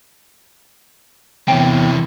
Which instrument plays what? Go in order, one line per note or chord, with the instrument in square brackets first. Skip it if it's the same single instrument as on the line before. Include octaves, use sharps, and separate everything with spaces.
[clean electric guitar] E2 C#5 G5 [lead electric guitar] C3 E3